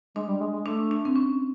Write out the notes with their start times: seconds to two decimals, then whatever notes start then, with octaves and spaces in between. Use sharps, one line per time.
0.16 G#3 D4
0.28 G3
0.40 G#3
0.53 G#3
0.66 A3 D4
0.91 D4
1.05 C4
1.16 C#4